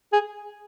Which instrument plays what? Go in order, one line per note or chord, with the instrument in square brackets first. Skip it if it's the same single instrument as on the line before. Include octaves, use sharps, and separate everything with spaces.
[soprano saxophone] G#4